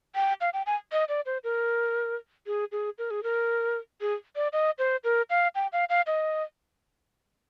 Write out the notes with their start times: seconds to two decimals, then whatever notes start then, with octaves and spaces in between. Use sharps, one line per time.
0.15 G5
0.41 F5
0.53 G5
0.66 G#5
0.92 D#5
1.09 D5
1.26 C5
1.44 A#4
2.47 G#4
2.72 G#4
2.98 A#4
3.11 G#4
3.23 A#4
4.01 G#4
4.36 D5
4.53 D#5
4.78 C5
5.04 A#4
5.30 F5
5.55 G5
5.73 F5
5.90 F5
6.07 D#5